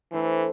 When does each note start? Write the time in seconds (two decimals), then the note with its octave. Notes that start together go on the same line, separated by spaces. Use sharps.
0.12 E3 A3 D4 A4 C5